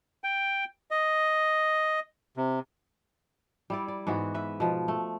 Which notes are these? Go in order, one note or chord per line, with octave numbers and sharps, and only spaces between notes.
G5
D#5
C3
G3 E4 D5
D5
G#2 E3 B3 F#4
B4 E5
B2 F3
A3